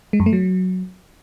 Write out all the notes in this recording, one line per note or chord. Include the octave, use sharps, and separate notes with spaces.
G#3
F#2
A3
F#3